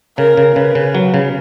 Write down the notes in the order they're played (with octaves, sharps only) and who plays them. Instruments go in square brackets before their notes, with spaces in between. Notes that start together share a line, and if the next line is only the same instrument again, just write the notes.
[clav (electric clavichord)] C#3 [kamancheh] A#4
[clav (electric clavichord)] C#3
[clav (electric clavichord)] C#3 [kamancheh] B4
[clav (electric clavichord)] C#3
F#3
C#3